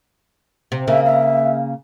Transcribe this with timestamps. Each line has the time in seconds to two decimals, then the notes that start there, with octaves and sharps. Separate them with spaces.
0.72 C3
0.88 C#3 A#3 E5
1.05 E5